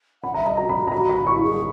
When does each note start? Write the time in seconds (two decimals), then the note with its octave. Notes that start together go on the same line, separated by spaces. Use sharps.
0.23 F#5 B5
0.34 E5 A#5
0.46 D#5 A#5
0.57 F#4 A#5
0.69 B5
0.75 F#4
0.87 A#5
0.92 F#4 B5
1.09 B5
1.27 E4 C#6
1.43 G#4